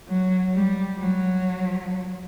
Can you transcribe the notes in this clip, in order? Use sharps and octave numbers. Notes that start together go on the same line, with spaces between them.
F#3
G3
F#3